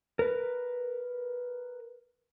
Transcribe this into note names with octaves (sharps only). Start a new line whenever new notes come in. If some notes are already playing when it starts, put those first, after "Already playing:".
A#4 B4